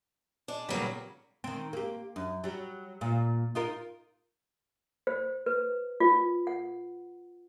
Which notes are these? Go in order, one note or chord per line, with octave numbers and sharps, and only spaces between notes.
G#3 D4
D#2 A#2 C#3 F#3 G3 B3
D#3 C4
A#3 G4
F#2
F#3 G3
A#2
D#4 F4 A#4
C5
B4
F4
F#5